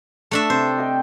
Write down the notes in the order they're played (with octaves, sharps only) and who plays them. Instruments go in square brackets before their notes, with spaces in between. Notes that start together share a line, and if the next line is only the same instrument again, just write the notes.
[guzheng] A3 D4 E5
[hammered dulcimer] C3 [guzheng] C5
[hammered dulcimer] D#5 G5